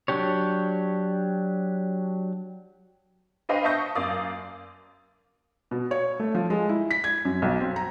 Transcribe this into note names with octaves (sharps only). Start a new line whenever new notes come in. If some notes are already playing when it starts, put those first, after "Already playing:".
F#3 D4 G4 C#5
D4 B4 C5 D#5 F5 G5
E5 A5 C#6 D#6 G6 A#6
F#2 A#3 D5 F5 D#6
B2
C#5
A3
F3
G#3
E4
B6
G#6
F#2
B1
C4
A#5